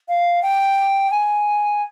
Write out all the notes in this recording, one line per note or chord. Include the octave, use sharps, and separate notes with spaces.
F5
G5
G#5